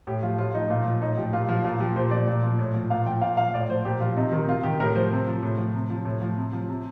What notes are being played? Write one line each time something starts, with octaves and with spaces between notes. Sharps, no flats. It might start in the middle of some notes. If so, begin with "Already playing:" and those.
A2 G4
F3 F4
A2 F4
F3 D#4
A#2 F4
F3
A2 D#4
F3 G4
A#2 F4
F3 F4
A#2 F4
F3 G4
A#2 C5
F3 D5
A#2
F3
A2
F3
A#2 F5
F3 G5
A#2 F5
F3 F5
A2 D5
F3 C5
A#2 G4
F3 F4
C3 D#4
D#3
C3 F4
D#3 G4
A2 A#4
F3 C5
C3
F3
A2
F3
C3
F3
A2
F3
C3
F3
C3